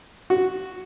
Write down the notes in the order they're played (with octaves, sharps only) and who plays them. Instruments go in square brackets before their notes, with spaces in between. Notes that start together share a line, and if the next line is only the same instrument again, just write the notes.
[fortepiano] F#4